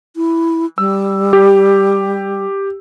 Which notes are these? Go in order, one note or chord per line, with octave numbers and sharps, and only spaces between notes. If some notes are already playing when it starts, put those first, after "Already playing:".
E4
G3 E6
G4